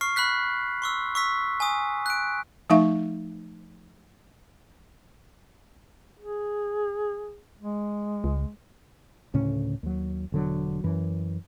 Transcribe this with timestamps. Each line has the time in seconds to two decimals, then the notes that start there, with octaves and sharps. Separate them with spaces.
0.01 C#6 F6 C7
0.16 B5 F6 F#6 B6
0.82 C6 C#6 E6
1.15 C#6 E6 B6
1.60 G#5 D#6
2.06 F#6 D7
2.70 F3 A3 D#4 E5 F5 C#6
6.19 G#4
7.60 G#3
8.24 C#2
9.34 D2 A2 C#3 C#4
9.83 D#2 F#3
10.32 E1 D3 F#3
10.84 F#2 E3